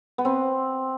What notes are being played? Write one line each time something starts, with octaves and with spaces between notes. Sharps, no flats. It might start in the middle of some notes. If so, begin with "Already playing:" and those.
B3
C4